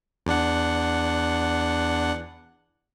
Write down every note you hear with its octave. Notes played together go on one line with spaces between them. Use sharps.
E2 D4 F#5